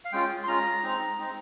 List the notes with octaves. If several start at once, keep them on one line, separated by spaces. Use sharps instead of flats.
F5
G#3 C#4 F4 G5
C6
G#3 C#4 F4 A#5
G#3 C4 D#4
G#3 C4 D#4